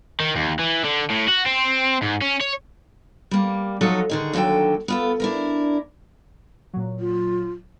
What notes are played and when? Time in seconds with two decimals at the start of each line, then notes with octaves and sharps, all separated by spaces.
0.20 D#3
0.36 D#2
0.59 E3
0.85 D3
1.10 A2
1.28 F#4
1.46 C4
2.02 G#2
2.22 C#4
2.41 C#5
3.31 G3 A#3
3.81 F2 F#3 D#4 F4 A4 C#5
4.10 D3 D#3 G#4
4.33 D#2 D3 F#3 A4 G5
4.88 B3 F4 A4
5.20 D4 E4 A#4
6.73 A#2 F#3
7.00 F4